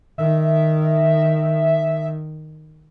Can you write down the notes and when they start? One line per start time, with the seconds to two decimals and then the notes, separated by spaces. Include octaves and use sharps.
0.18 D#3 E5